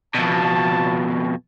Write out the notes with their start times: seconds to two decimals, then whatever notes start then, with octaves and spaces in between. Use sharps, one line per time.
0.15 F2 B2 A5